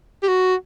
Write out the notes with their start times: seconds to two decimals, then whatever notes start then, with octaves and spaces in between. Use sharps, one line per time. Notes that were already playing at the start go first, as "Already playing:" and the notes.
0.23 G4
0.28 F#4